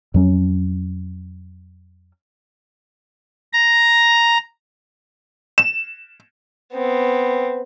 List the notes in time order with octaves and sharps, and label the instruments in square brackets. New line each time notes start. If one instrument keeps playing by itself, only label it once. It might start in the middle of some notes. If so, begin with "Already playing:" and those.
[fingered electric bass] F2 F#3 C#4
[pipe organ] A#5
[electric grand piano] E7
[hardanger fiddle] B3 C4